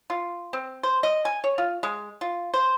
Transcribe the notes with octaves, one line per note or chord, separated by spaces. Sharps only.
F4
C4
C5
D#5
G#5
C#5
F4
G#3
F4
C5